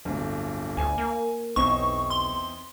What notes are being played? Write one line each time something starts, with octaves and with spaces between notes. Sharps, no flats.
D1 G1
D2 G#5
A#3
B1 E2 C4 D#4 C#6
C6